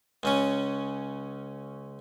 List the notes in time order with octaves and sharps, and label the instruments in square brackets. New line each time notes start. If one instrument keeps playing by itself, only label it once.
[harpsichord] C#2 C#3 C#4